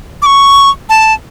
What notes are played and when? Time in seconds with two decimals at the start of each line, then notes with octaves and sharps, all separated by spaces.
0.22 D6
0.26 C#6
0.89 A5